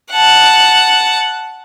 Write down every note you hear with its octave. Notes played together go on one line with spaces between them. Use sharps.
F#5 A5